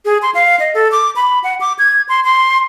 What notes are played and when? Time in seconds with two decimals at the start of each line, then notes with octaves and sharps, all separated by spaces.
0.05 G#4
0.22 C6
0.35 F5
0.60 D#5
0.74 A4
0.92 D6
1.16 B5
1.44 F#5
1.61 D6
1.79 G#6
2.09 C6
2.24 C6